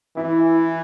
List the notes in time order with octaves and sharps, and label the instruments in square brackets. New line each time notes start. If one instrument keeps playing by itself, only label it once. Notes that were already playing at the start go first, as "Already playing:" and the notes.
[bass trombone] E3 [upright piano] E4